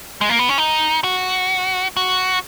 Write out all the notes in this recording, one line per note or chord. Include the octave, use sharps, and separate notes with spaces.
G#3
A#3
B3
C#4
D#4
F#4
F#4